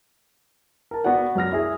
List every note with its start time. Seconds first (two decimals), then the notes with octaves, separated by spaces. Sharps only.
0.91 A#4 A5
1.04 B3 F#4 D5 F#5
1.35 F#2 F#4 F6 A#6
1.52 E4 G#4